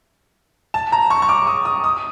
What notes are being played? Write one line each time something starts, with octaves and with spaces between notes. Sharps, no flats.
A5
A#5
C#6
C#6
D6
D#6
D#6
D#6